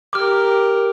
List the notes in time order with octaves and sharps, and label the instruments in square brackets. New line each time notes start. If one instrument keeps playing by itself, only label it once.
[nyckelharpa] G4 A#4 [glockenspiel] D6 F6